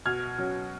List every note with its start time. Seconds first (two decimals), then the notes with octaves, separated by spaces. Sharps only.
0.06 B2 F6 G#6
0.38 F#3 C#4